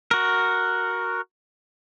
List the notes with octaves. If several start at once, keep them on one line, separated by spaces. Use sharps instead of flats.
F#4 A#4